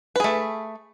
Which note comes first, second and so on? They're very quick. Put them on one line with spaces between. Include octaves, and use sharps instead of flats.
B4 G#4 A3